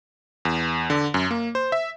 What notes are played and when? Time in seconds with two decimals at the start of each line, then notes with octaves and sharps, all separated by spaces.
0.45 E2
0.90 D3
1.14 F#2
1.31 A#3
1.55 C5
1.72 E5